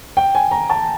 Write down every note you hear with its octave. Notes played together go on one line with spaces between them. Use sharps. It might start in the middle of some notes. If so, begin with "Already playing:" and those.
G5
G#5
A#5
A5